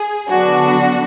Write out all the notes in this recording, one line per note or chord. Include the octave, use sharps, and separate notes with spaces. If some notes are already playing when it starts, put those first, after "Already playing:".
Already playing: G#4
D3 F#3 B3 D4 F#4